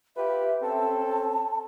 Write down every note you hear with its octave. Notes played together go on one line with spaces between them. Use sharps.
F4 G4 B4 E5
C4 C#4 A4 A5